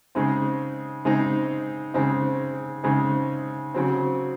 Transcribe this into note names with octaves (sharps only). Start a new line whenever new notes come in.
C#3 G#3 C4 D#4
C#3 G#3 C4 D#4
C#3 G#3 C4 D#4
C#3 G#3 C4 D#4
C#3 F#3 C4